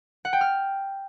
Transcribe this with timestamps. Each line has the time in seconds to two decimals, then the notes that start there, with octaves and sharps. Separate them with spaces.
0.25 F#5
0.33 G5
0.41 F6